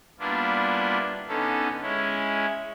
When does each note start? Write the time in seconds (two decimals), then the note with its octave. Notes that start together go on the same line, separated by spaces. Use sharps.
0.19 G3 A#3 B3 D4 E4 F4
1.28 D3 B3 C#4 D#4 A4
1.82 G#3 C#4 E4